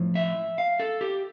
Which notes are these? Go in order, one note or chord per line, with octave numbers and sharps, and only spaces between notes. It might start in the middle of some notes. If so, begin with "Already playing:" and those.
Already playing: A2 F3
E5
F5
A4
G4